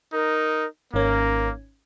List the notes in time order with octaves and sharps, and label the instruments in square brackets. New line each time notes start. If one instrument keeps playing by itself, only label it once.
[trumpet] D#4 [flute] A#4
[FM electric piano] G#1 C#4 [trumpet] A#3 [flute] A#4